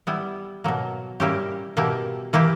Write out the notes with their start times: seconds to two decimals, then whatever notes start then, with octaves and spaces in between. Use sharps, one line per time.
0.07 G3 B3 E4
0.64 B2 F#3 A#3
1.20 G3 A#3 C#4 E4 G4
1.77 B2 A#3 E4 G4
2.33 E3 A#3 E4 G4